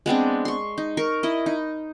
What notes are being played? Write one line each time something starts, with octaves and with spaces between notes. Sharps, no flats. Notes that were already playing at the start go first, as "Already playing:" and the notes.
G#3 B3 C4 D4
C6 C#6
D#4
A#4 C#6
E4 D#5
D#4